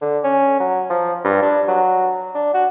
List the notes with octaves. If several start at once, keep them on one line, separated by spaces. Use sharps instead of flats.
D3
C#4
F#3
F3
G2
D4
F#3
D4
F#4